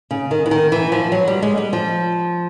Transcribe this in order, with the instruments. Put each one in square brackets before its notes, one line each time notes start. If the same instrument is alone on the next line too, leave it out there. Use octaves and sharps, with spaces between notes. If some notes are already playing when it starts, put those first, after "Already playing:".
[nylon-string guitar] C#3
D#3
E3
D#3
E3
F3
F#3
G3
G#3
G3
F3